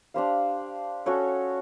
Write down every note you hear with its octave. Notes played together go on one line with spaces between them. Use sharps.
D4 G4 C5 F5
C#4 F#4 A4 C#5